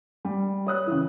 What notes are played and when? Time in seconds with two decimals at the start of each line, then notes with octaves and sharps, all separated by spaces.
0.25 G3
0.67 C#5 D#6 F#6
0.87 C#3 E3